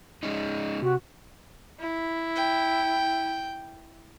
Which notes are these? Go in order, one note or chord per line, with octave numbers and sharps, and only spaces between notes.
G#3 C#4 D#4
C3 F#4
E4
G5